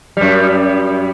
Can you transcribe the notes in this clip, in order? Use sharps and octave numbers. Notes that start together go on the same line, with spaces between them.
F#2 G3